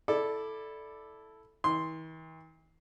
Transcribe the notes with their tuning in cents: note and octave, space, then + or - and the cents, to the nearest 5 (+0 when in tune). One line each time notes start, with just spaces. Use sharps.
E4 +0 A4 -5 D5 +10
E3 -45 C6 +0